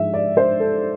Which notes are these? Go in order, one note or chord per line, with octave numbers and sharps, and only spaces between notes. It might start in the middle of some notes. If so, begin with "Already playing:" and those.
Already playing: G#2 F3 G#3 E5
D5
C5
A4